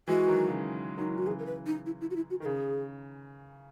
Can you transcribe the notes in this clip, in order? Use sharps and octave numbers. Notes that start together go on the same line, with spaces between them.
E3 G#3 F#4
D#3 F#3
C#3
D#3 F#3 D#4
E4
F#4
C#3 E3 G#4
A#4
B4
D#4
E4
E4
F#4
E4
F#4
D#3 A#4
C#3 G#4